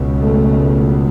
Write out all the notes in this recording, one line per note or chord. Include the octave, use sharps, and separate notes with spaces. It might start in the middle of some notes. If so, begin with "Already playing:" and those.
Already playing: C#2 B2
A3